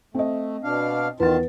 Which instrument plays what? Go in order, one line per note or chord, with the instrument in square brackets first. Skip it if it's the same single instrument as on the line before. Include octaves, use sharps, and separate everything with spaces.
[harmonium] A3 [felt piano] C4 D#5
[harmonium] B2 D4 F5
[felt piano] E2 B3 A6 [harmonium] D#3 F4 A5 [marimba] B4